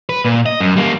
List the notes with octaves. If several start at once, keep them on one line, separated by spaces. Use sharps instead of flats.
B4
A#2
D#5
F#2
G3 A#3